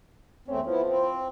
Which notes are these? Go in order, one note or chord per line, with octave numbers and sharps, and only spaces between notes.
E2 A3 C4 C#4
F3 B3 E4
C4